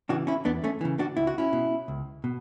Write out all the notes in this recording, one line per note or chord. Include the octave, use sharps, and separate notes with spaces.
C#3 E3 D4 F#4
C#4 E4
E2 B3 D4
A3 C#4
C#3 E3
D4 F#4
C#2 E4
F#4
C#4 E4
B2
C#2
B2